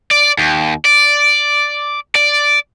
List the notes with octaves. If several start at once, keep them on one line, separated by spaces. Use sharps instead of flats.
D5
D#2
D5
D5